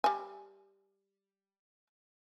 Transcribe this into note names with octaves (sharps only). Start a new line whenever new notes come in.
G3 G#5